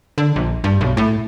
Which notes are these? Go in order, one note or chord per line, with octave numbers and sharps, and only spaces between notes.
D3
A#1
G2
B1
A2